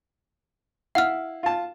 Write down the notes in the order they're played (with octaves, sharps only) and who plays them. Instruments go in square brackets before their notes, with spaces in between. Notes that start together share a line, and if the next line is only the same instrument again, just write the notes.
[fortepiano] E4 F5 [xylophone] F#5 F6
[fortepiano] F4 A5